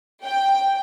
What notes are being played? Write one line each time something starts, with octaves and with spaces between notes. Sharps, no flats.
G5